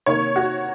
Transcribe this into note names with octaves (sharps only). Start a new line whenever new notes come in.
C3 D#3 A#3 C#5
F#4